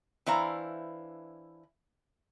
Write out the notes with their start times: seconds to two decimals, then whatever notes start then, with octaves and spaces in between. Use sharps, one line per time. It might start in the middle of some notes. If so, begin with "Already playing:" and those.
0.26 E3 D4 E4 C5 F5 A#5